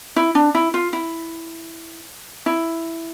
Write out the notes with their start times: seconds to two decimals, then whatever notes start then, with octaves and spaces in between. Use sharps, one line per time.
0.16 E4
0.35 D4
0.55 E4
0.74 F4
0.93 E4
2.46 E4